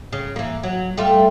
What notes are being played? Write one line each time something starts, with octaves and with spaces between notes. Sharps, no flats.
C#3
E3 A#3
F#3
G3 A3 F4